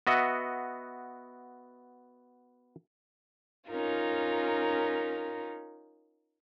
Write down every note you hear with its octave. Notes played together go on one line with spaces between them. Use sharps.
B3 F#4 D#5 E5
C#4 D#4 F4 A#4